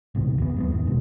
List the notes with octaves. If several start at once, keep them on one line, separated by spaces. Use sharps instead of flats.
G#1 C#2 B2 D#3
D#2 B3
F#2 G#3 B3
G#1 E2 B2 D#3
F#1 B2 G#3